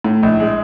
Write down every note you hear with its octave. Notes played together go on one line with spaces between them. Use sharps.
A2
A#1
G#3